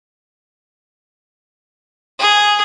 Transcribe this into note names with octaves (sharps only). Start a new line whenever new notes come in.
G#4